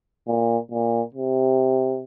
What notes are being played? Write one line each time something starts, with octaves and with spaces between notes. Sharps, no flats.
A#2
A#2
C3